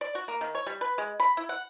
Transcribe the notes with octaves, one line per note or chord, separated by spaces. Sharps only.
D5
F#4
A#3
D#3
C#5
G3
B4
G#3
B5
E4
F#5